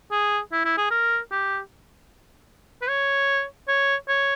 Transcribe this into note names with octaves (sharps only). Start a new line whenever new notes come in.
G#4
E4
E4
G#4
A#4
G4
B4
C#5
C#5
C#5